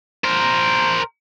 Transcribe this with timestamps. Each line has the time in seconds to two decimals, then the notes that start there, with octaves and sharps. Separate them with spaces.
0.24 A#4 C5